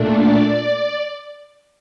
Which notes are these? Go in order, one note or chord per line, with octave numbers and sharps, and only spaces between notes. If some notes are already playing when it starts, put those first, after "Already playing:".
Already playing: A#2 A3 D4
D5